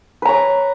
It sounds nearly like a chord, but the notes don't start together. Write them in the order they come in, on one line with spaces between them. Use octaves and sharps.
B4 A#5 C#5